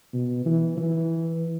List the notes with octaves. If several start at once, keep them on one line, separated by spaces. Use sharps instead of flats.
B2
E3
E3